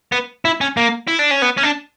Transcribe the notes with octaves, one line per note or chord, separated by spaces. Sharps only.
B3
E4
C#4
A#3
E4
D4
C#4
B3
C#4
D4